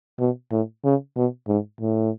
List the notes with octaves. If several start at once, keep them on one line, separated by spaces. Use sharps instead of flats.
B2
A2
C#3
B2
G#2
A2